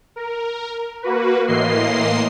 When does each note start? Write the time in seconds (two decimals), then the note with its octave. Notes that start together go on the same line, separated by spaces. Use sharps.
0.16 A#4
1.03 A#3 F#4 B4
1.48 A2 E3 A#3 D#5 C6 C7